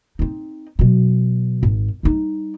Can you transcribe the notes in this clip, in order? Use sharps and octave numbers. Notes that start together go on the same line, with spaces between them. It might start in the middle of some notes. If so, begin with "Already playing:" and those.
C4 D#4
B2 F#3
G#1
G3 D#4